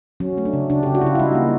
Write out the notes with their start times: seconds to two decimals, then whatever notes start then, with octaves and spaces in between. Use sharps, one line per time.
0.20 F#3 C#4
0.38 A3
0.45 D4
0.53 C#3
0.70 C#3 D4
0.83 C#3 G4
0.95 F#4
1.01 C#3 E4 F4
1.15 E4
1.19 G3 D#4
1.35 A#3